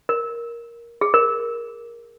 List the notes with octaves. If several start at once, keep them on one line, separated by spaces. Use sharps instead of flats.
A#4
G#4
A#4